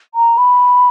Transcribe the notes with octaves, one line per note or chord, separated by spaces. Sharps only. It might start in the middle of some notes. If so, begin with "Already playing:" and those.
A#5
B5